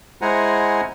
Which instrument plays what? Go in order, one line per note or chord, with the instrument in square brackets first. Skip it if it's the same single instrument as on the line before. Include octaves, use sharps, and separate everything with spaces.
[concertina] G#3 E4 C5 F#5 G#5 A#5